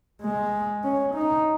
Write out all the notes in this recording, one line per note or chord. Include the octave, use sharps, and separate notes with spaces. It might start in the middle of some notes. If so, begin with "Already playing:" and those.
G#3
C#4
D#4